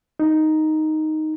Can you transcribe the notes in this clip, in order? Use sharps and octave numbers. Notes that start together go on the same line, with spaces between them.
D#4